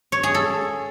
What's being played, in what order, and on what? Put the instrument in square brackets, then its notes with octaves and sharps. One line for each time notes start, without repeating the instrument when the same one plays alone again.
[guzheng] C#5
G#4
A4